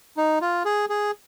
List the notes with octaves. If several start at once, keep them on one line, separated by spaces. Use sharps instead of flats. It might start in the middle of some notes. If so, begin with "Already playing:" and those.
D#4
F4
G#4
G#4